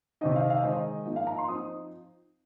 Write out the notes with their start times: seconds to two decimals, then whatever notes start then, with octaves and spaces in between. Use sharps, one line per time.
0.21 C3 D#3 C4 D#4 D#5
0.36 F5
0.50 F5
0.57 D#5
0.63 D#3 G#3 D#4 C5
0.72 D#5
1.05 F3 A#3 D#4 D#5
1.16 F5
1.27 A#5
1.38 C6
1.48 F3 C4 D#4 D#6